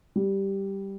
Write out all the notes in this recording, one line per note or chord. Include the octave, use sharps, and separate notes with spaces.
G3